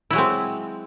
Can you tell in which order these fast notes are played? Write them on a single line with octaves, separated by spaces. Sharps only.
E4 F#3 G#3 C4